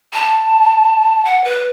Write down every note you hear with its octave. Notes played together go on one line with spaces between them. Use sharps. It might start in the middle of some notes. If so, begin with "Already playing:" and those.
A5
F#5
B4